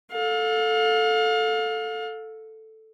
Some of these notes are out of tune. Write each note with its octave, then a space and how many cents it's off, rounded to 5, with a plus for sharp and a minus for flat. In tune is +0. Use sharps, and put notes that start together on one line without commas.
A4 +0 F5 +30